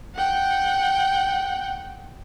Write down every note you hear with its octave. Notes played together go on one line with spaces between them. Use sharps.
F#5 G5